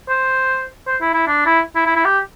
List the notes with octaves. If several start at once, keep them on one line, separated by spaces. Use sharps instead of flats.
C5
C5
E4
E4
D4
E4
E4
E4
E4
G4